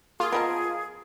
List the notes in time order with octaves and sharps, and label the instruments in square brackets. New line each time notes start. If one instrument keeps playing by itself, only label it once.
[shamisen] A#3 [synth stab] F4 [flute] G#4
[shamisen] F3 B3 [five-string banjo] A#4 D#5 A5